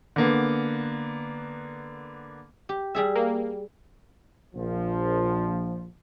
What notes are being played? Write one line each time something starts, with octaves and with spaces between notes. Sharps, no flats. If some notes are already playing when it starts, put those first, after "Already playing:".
D3 A#3 B3
G4
G3 G#4 E5
A#3
A#1 F3